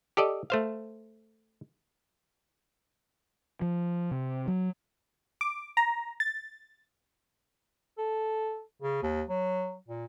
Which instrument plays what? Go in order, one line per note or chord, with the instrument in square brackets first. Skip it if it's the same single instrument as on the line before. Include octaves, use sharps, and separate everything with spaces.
[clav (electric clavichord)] G4 A4 D5 D#5
A3 C5 F5
[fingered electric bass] F3
C3
F#3
[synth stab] D6
A#5
A6
[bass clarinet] A4
C#3
D#2
F#3
A#2